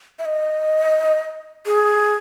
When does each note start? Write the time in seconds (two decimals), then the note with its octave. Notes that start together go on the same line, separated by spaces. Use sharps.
0.19 E5
0.25 D#5
1.66 G#4